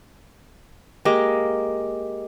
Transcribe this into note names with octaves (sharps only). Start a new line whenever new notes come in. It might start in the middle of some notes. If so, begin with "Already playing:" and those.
G#3 A#3 G4 A#4 D#5 D6